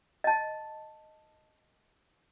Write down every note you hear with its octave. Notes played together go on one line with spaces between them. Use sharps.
D#5 A5